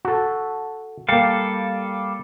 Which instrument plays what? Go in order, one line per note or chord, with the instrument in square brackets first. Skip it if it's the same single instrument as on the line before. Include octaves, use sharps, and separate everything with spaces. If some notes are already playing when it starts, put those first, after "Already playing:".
[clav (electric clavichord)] F#4 A4
[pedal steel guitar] G3 A4 F5 [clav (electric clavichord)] A#3 G5